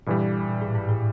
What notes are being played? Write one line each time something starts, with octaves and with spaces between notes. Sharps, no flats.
G2 A#2 E3 G3
A#2
A2
G#2
A2